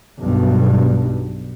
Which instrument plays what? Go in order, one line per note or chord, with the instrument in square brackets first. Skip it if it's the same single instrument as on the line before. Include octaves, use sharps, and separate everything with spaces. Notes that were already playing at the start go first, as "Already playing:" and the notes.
[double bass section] B1 G2